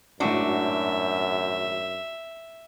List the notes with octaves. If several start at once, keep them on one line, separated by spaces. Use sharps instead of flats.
G#1 F#2 A2 D4 F#4 E5 F#5